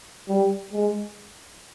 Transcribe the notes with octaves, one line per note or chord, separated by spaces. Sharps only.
G3
G#3